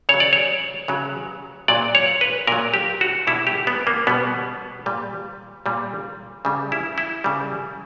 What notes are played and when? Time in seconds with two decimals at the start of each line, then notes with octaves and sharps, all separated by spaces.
0.09 C#3 F#3 C#5
0.20 D5
0.33 C#5
0.88 C#3 F#3
1.68 A#2 F#3 D5
1.95 C#5
2.21 B4
2.47 A#2 F#3 A#4
2.74 G4
3.01 F#4
3.27 B2 G3 E4
3.47 G4
3.67 B3
3.87 A#3
4.07 B2 G3 B3
4.86 A#2 G3
5.66 A#2 G3
6.45 C#3 G3
6.72 E4
6.98 E4
7.24 C#3 G3